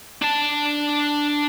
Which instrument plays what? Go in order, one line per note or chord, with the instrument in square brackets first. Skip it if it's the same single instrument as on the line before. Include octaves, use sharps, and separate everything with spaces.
[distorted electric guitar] D4 A5